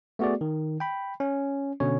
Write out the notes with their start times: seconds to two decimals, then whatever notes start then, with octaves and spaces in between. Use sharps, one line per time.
0.19 A3 B3 F#4 G#4 D5
0.41 D#3
0.80 G5 B5
1.20 C#4
1.80 B2 D3 C#4 C#5